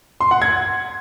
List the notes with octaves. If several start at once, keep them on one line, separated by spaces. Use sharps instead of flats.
C6
F#5
G#6